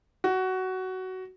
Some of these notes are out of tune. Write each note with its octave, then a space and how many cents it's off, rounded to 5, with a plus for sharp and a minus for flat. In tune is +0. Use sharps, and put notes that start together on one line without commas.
F#4 +15